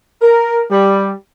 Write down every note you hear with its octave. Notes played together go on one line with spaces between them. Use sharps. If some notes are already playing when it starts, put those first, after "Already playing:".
A#4
G3